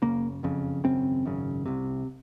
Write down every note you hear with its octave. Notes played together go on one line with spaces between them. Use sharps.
F#1 F2 C#3 A#3
F#1 F2 C#3
G#1 F#2 C#3 C4
G#1 F#2 C#3
C2 C3